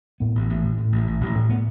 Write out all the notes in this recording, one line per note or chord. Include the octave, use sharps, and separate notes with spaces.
A2 B3
A1
A1
A2
A2
A1
A1
A1
A2 C#4
A2 B3